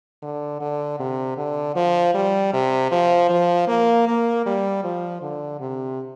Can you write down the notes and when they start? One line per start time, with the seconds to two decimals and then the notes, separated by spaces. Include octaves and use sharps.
0.22 D3
0.61 D3
1.00 C3
1.37 D3
1.76 F3
2.14 G3
2.53 C3
2.92 F3
3.30 F3
3.68 A#3
4.08 A#3
4.46 G3
4.84 F3
5.22 D3
5.60 C3